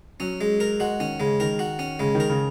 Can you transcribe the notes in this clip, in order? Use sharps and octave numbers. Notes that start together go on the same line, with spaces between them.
F#3 C#4
G#3
A#4
G#3 F#4
D#3 C#4
C#3 G#3
D#3 A#4
F#4
C#4
C#3 G#3
D#3
A#4
C#3